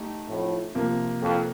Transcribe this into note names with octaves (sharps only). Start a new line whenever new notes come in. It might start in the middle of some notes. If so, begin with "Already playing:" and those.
Already playing: A3 D#4 G4
F2 A2
C3 F3 A#3
F2